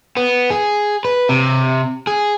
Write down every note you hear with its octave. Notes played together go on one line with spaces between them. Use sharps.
B3
G#4
B4
C3
G#4